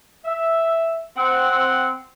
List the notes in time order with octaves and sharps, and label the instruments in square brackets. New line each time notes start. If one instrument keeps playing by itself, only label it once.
[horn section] E5
C4 F#5